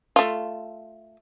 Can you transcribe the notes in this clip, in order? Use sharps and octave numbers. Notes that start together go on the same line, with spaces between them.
A3 F4